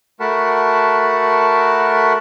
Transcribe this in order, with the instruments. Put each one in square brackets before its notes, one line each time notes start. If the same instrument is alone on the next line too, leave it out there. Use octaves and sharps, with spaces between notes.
[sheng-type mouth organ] A3 F#4 A#4 F#5 A5 B5